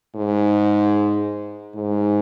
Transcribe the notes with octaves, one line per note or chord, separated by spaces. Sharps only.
G#2
G#2